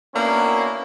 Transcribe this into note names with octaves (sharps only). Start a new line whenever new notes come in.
A#3 B3 C#4 D4 E4 F#4